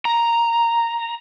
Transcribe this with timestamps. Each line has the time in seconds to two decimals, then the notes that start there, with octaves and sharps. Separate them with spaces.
0.05 A#5